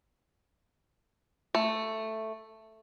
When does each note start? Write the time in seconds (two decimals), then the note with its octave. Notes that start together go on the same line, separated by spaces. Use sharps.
1.55 A3